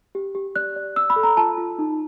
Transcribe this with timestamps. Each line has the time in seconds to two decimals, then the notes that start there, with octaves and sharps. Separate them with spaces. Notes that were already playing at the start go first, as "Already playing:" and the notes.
0.15 G4
0.35 G4
0.56 D5 F#6
0.76 D5
0.96 D5 E6
1.10 B5
1.16 A4
1.23 A#5
1.37 F4 A5
1.58 F4
1.78 D#4